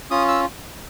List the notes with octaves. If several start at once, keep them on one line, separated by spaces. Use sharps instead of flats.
C#4 F4 D#6
E6